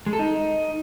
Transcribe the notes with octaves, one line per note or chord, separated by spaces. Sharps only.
G#3
A4
D#4